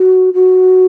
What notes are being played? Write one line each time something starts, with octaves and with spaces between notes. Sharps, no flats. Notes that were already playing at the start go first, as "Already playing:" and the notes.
Already playing: F#4
F#4